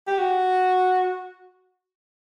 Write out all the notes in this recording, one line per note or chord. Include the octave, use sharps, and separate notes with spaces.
G4
F#4